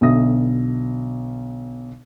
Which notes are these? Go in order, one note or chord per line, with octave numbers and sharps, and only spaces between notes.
B1 B2 D3 E5 D#6 A#6